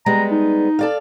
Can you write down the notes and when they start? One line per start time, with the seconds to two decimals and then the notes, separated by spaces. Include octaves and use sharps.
0.06 G3 G#3 B3 A#5
0.31 D#4
0.79 A4 D5 F5